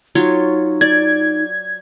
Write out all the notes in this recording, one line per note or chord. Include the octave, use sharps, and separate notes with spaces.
F#3 D#4 F4 C#5
D5 G#6